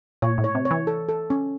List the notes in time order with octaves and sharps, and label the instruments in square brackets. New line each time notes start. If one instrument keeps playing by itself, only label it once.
[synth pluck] A#2 [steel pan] C#5
[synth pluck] A2
[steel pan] C#5
[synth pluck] C3
[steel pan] C#5
[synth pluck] E3
[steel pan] A4
A4
C#4